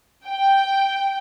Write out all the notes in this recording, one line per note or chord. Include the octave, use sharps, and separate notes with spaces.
G5